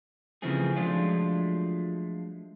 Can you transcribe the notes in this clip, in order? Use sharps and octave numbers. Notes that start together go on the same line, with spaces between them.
C#3 E3 F3 A3 C4 G#4
F3 F#3 G#3 A3 D4 F4